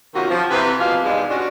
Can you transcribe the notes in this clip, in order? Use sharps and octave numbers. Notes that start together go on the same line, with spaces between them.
C3 D#3 A#3 C#4 F4 F#4
F3
C3 E3 B4
B2 F3 A#3 G4 F5
E2 G#2 B2 G3 G#3
G#3 C#4 D4 F4 F#4